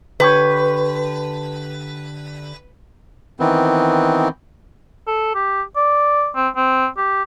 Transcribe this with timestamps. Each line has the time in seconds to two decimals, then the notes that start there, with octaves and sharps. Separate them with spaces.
0.20 D3 G4 B4 C#5
3.40 D#3 E3 B3 C4
5.07 A4
5.35 G4
5.76 D5
6.35 C4
6.56 C4
6.97 G4